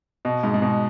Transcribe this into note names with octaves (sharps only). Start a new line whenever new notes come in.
B2
G#2
G#2
B2